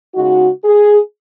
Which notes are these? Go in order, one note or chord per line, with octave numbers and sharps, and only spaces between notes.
C#3 G#3 D#4 F#4
G#4